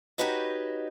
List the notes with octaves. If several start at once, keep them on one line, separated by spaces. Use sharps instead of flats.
D#4 F#4 G4 B4 C#5 D#5